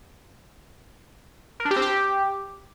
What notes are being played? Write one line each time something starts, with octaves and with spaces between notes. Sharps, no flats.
A#4
D4
G4
C4
G4